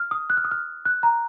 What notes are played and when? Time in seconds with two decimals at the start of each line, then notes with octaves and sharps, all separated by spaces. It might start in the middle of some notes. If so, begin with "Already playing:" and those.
Already playing: F6
0.11 D#6
0.30 F#6
0.37 F6
0.44 D#6
0.51 F6
0.85 F#6
1.03 A#5